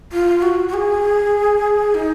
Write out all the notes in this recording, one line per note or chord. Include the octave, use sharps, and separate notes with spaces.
F4
F#4
F#4
G#4
D#4